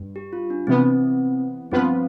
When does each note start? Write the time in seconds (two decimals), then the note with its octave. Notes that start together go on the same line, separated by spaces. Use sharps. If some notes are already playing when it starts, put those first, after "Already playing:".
Already playing: G2
0.16 G4
0.33 F4
0.50 D4
0.67 C3 E3 B3 C4
1.71 G2 F3 B3 C4 F4 B4